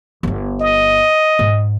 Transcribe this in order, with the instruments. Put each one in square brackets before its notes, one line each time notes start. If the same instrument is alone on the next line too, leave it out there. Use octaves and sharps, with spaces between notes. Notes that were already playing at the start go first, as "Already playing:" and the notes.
[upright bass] G1 G3
[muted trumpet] D#5
[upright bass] G#2